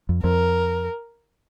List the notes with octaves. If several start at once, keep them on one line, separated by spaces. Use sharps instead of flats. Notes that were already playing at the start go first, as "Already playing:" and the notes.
F2
F2 A#4